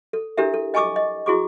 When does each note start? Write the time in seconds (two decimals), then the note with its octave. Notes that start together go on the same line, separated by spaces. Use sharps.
0.13 A4
0.37 D4 E4 G4 A4 A#4 E5
0.54 A4
0.74 D#5 G#5 A5 C#6 D6 E6
0.96 D#5
1.26 E4 F#4 G#4 C#6 D6